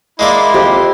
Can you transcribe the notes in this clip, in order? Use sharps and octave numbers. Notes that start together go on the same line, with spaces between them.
G#3 A#3 E4 D5 C6
F2 G4